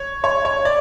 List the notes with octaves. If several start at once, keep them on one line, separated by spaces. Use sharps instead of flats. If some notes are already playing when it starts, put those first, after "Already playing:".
Already playing: C#5
C#5
C#5
D5